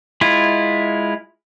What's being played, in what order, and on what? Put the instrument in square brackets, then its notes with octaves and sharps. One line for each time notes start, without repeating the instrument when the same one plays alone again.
[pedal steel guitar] G#3 E4 F4